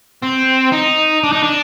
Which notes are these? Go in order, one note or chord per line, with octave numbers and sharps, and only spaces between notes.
C4
D#4
D4
D#4
D4